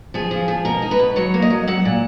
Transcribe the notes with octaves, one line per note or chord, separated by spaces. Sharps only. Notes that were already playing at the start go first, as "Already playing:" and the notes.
F3 G#4
F3
F3
B2 A#4
D#4
B4
B2
F#3 C#5
A#3
D#5
F#3
F#3 F#5
A#2